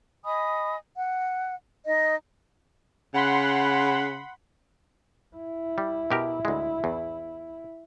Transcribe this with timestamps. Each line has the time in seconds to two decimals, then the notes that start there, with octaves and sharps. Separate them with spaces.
0.24 D#5 G#5 B5 D#6
0.96 F#5
1.86 D#4 D#5
3.14 C#3 F#5 B5 C6
5.36 E4
5.78 G3
6.11 B2 G4 A#4
6.45 D2 G#3
6.84 E2